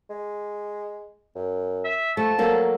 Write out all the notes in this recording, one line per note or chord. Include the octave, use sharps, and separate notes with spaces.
G#3
F#2
E5
F3 A3 A5
F#3 A#3 A4